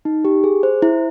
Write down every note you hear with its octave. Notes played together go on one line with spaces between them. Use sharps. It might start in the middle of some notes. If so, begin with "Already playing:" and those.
D#4
G4
G#4
C5
E4